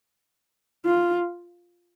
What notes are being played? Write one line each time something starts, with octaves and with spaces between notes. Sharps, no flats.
F4